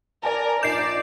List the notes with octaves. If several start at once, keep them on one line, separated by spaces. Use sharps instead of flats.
A#4 D5 G#5 A5
A#1 D#4 D5 G6 C7 E7